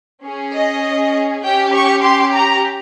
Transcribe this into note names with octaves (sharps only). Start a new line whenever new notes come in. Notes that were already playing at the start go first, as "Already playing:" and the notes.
C#4 G#4
D#5
C#4 G4 G5
C#6
C6
A#5